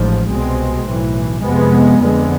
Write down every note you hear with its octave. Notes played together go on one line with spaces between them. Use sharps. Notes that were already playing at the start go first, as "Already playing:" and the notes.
Already playing: A1 G#2 F3
C2 B2 G#3 C4
B1 A2 E3
F2 C3 G#3 B3
F2 D3 G#3 B3